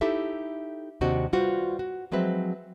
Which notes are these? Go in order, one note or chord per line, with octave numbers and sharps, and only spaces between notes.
D#4 E4 G4 A4 E5
D#2 C3 C4 D4 F#4 D#5
G3 F4 F#4 B4 C5
F#4
F3 F#3 G#3 C4 B4 E5